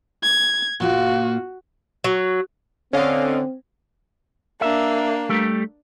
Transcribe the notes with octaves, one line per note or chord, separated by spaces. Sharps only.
G#6
A#2 A#3 F4 F#4
F#3
D3 C4 C#4 C#5 D#5 F5
A#3 D4 E5
G3 A3 G4